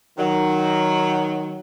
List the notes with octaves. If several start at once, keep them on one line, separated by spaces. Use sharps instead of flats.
D#3 F#3